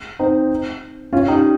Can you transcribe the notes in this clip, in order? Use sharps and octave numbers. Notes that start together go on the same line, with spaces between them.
C4 D#4
C#4 F4
D#4 G4